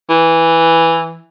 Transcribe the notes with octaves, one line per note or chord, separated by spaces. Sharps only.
E3